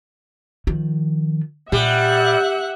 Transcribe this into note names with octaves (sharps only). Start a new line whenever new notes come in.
D#3 F3
A#2 G3 E5 F#5 F#6